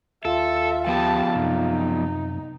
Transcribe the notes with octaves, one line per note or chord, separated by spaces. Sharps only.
D#2 F4 A4 E5
F3 B3 G4 A5
F#2 C3 D#4